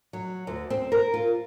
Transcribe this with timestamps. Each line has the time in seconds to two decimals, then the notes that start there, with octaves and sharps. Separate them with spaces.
0.13 F#3
0.47 D2
0.70 C4
0.92 A#4
1.14 F4